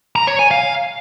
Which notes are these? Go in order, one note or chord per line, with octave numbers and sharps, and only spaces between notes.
A#5
C#5
G#5
F5